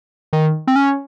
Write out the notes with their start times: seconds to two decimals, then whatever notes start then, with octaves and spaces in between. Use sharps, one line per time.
0.33 D#3
0.67 C4
0.76 C#4